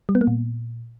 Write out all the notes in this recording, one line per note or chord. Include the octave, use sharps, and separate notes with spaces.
G3
B3
A#3
A#2